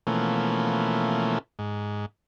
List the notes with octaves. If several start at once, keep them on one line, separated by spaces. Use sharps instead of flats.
B2 E3 F3 A3 A#3 C#4
G#2